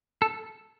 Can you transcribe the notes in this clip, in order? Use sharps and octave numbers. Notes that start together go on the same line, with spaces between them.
A4